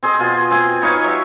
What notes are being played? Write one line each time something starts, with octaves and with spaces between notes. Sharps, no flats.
C4 G#4 C5 D#5
B2 F4 G#4
C4 G5 G#5
B3 D#4 C#5 F5
F#3 G4 E5